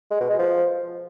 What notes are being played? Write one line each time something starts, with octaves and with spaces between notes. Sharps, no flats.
G#3
B2
G#3
F3